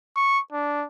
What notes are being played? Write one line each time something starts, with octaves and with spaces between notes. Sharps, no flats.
C#6
D4